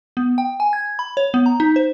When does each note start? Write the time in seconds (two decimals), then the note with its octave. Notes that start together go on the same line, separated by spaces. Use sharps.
0.17 B3
0.38 G5
0.60 G#5
0.73 G#6
0.99 B5
1.17 C#5
1.34 B3
1.46 A#5
1.60 D#4
1.76 C5